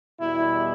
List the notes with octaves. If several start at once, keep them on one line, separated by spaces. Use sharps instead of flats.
E2 B2 G3 E4